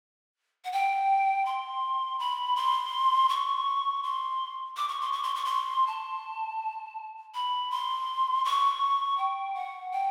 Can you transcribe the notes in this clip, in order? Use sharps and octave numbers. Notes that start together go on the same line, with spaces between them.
F#5
G5
C6
B5
C6
C#6
C6
D6
C#6
C6
C#6
C6
C#6
C6
A5
B5
C6
C#6
G5
F#5
G5